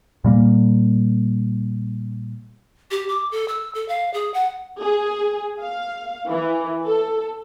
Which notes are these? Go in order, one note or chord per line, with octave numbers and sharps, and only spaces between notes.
A#2 G3 A#3
G4
D6
A4
E6
A4
F5
G#4
F#5
G#4
F5
E3
A4